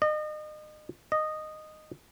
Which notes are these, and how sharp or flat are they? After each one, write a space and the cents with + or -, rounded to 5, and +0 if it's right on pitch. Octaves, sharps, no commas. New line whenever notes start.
D#5 -35
D#5 -10